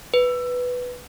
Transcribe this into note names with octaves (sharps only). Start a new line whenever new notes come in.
B4